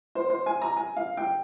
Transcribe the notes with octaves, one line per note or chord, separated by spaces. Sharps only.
C5
C5
G#5
A#5
G#5
F5
G5